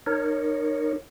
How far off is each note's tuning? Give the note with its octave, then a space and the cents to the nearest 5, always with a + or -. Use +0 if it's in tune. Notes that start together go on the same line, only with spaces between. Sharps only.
D#4 -35 A#4 -5 C#5 +0